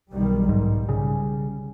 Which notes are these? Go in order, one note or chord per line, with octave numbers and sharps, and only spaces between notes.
B1 D#3 G3
G#2 G3
C#3